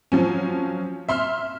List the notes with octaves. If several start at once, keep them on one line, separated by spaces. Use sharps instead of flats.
F3 F#3 C#4
E5 C6 F6